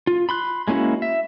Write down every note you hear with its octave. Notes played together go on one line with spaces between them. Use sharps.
F4
B5 C6 F#6
G#3 A#3 C#4 E4 F#4
E5